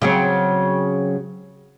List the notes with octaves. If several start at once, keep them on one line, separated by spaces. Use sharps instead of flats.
C#3 F#3 C4